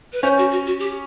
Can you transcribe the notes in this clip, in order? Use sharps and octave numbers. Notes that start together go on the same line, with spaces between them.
B4
C#4 C5 C#5
F#4
F#4
F#4
G4